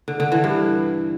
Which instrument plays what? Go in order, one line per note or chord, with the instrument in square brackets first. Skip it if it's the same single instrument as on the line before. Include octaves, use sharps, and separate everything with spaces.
[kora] D3
D3
E3
G2